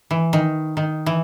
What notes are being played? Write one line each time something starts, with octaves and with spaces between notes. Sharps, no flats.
E3
D#3
D#3
E3